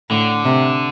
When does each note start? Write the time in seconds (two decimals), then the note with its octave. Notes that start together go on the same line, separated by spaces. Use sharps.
0.10 A2 D3
0.45 C3